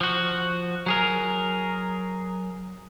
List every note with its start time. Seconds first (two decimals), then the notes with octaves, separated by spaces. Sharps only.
0.01 F3 F#4
0.86 F#3 G#4 A#4